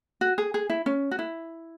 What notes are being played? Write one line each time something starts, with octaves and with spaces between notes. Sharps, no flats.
F#4
G#4
G#4
E4
C#4
F#4
E4